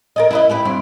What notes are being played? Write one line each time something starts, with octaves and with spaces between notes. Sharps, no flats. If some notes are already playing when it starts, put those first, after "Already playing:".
A#4 D5 D#5
E4 B4 D#5
E4 G4 B4
G2 C4 E4